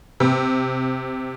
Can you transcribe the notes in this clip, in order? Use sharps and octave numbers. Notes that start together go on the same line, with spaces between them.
C3